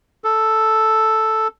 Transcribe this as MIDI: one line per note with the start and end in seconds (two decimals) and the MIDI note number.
0.24 1.48 69